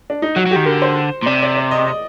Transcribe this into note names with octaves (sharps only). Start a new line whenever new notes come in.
D4
D#4
F#3 F#4
F#3 G4
D#3
D3 A#4
C5
A#2
C3 D5
D5
D5
D#5
D#5